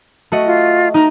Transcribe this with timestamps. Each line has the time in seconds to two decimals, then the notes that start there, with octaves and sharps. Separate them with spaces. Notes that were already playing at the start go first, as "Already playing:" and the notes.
0.32 A3 F#4 D#5
0.46 F4
0.94 D#4 A#5